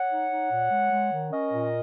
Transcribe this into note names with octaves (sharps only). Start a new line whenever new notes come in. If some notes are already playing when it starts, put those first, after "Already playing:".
Already playing: C#5 F#5
D#4
D#4
A#2
G#3
G#3
D#3
C#4 A#4 D#5
A#2